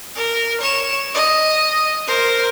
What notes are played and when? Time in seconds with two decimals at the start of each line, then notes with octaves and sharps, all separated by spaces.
0.15 A#4
0.61 C#5 E7
1.14 D#5
2.07 A#4 C5